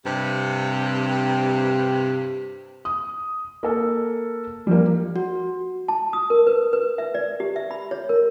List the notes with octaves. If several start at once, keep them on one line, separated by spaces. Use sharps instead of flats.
G2 C3
D#6
A#3 A4
F3 G3 A#3
F#4
A5
D#6
A#4
B4
B4
E5
D5
G4
E5
B5
C#5
A#4